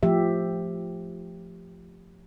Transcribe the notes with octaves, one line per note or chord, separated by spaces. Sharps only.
F3 A3 G4 E5